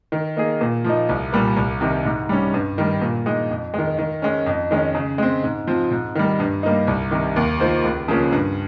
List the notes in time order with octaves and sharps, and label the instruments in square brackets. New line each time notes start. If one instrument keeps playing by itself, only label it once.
[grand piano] D#3
A#3 D#4 G#4
A#2
F3 A#3 D#4
C2
A#2 G3 A#3
C2
C3 D#3
G#2
G3 C#4
G2
D#3 G3
A#2
G#3 D#4
F2
D#3 G#3
D#3
G#3 C#4
F2
D#3 G#3 C#4
C#3
G#3 C4
G#2
F3 C4
G#2
D#3 G3
G2
G3 A#3 D#4
C2
C3 D#3
D#2
D#3 A#3 F4 C5
C#2
C#3 F3 A#3 C#4
G2